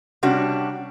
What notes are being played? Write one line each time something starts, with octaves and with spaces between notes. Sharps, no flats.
C3 G3 C#4 D4 F#4